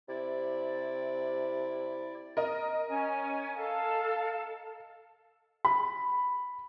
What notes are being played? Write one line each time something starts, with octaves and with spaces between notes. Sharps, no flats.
C3 E4 D5
A#4 D#5
C#4 G#5
A4 F5 A5
B5